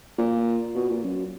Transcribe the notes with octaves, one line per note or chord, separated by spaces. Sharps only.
A#2
B2
A#2
F#2